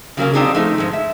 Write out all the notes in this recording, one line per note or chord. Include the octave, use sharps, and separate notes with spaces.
C#3 F#3 A#3 C#4
A#3 C4 D4 D#4 G4 G#4
F3 A3 D#4
G#2 G#3
E5